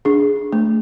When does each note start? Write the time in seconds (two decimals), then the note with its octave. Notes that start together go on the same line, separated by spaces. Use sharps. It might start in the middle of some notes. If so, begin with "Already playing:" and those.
0.05 D4 G#4
0.53 A3